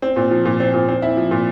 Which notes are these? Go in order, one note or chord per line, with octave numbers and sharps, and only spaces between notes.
C4
A#2
F3
A#2
C4
A#2
C4
E4
F3
A#2